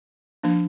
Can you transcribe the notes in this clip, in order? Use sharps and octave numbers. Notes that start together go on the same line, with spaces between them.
F3 A#3 D4